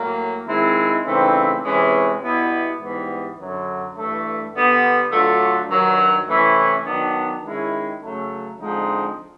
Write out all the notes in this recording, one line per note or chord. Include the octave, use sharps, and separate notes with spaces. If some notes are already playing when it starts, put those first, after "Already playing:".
Already playing: A2 F#3 A#3
D#3 G#3 C4 E4
C#3 E3 A3 C4 D#4
C3 E3 G#3 C#4
B2 G3 B3 E4
G#2 E3 G3 B3
F#2 D3 F#3
G2 E3 A3
D3 G3 B3
D3 F#3 A3 D4 F4
G2 D#3 F#3
C3 E3 A3 C#4 E4
D#3 F#3 B3 D4
D#3 G#3 C#4 E4
C#3 F#3 A3
D3 F3 G#3 C4 D#4